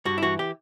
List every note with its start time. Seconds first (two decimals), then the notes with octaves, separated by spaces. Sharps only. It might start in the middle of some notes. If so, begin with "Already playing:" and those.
0.05 G2 F#4
0.18 E4
0.22 E3 F#4
0.39 G4